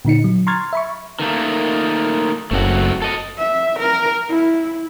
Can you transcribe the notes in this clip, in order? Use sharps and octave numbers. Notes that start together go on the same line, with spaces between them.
A#2 D3 D#4 C#7
F#3
A#5 C6 C#6 F6 G#6 A6
E5 B5 C#6
D#3 A3 A#3
F#1 A3 C4 F#4
A4 D#5
E5
A#4
E4